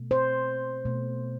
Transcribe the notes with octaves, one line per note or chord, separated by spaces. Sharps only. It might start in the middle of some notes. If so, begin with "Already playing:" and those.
Already playing: B2 A3
C5
B2 A3